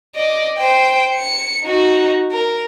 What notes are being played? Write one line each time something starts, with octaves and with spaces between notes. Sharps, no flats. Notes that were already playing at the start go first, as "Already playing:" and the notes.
D5 D#5
C5 G5
C#7
D#4 F#4
A#4